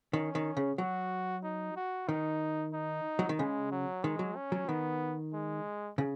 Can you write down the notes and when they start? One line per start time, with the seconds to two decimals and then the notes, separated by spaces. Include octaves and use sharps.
0.13 D#3 C#4
0.35 D#3
0.57 C#3
0.78 F#3 F#4
1.43 D#4
1.76 F#4
2.08 D#3 D#4
2.73 D#4
3.19 F#3
3.29 D#3
3.38 C#3 G#3
3.71 F#3
4.03 D#3 G#3
4.19 F#3
4.36 C#4
4.52 F#3
4.68 D#3 B3
5.33 G#3
5.98 C#3